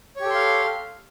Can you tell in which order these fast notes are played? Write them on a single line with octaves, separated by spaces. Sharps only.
C#5 G4 A4 C6 F5